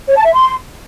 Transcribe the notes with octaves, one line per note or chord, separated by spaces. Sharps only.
C#5
A5
E5
C6